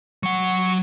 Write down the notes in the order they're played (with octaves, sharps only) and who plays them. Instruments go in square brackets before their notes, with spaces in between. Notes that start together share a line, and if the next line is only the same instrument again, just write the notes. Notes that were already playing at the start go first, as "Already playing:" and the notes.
[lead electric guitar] F#3 F#5 [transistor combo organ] C#6